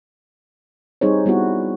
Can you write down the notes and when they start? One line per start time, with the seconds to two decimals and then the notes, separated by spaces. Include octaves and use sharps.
1.01 G3 C4 D#4 G#4 C5 C#5
1.26 G3 B3 E4 F#4